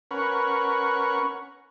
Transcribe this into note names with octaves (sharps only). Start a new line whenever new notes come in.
C#4 A#4 B4 F#5 C#6